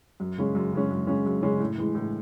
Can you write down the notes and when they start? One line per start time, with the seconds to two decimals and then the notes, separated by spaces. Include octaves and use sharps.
0.20 F#2
0.38 C#3 G#3 C#4
0.55 F#2
0.73 C#3 G#3 C#4
0.91 F#2
1.07 C#3 G#3 C#4
1.26 F#2
1.43 C#3 G#3 C#4
1.60 A2
1.78 E3 G#3
1.95 A2